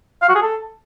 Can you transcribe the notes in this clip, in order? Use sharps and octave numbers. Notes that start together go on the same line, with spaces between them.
F5
F#4
G#4
A4